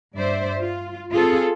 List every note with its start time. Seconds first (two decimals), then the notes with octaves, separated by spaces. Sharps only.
0.15 G2 C5 D5 E5
0.59 F4
1.11 C4 F4 G#4 A4